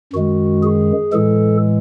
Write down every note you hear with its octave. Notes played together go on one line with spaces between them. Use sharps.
F#2 D#3 G#3 F#4
G#4
A2 E3 G#3 A4